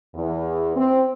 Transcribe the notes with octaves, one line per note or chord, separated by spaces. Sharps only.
E2
C4